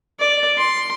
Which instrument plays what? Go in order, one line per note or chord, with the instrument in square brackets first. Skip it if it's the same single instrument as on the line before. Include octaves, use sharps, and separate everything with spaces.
[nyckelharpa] D5
C6